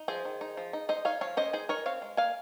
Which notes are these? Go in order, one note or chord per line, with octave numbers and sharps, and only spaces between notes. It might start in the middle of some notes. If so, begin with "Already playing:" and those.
Already playing: D#4
F3 G#4 C5
D#3
D#4
F3
D#4
D#4 C5 D#5
D#4 C#5 F5
F3 C#5 F5
C#4 C5 D#5
D#4 G#4 C5
D#4 A#4 C#5
C4 C#5 F5
G#3
A#3 F5 G#5